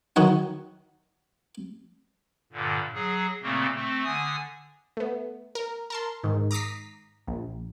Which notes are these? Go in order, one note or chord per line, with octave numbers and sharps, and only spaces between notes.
D#3 F#3 D#4 C#5 F#5
G2 A#2 D3
F#3 G#4
A#2 C#3 A3 A#3 C4
A3 C4
D3 G#5 D#6
A3 B3
A#4
A#4 A5 C6
G#2 D#3
A#5 D6 D#6 B6 C7
A#1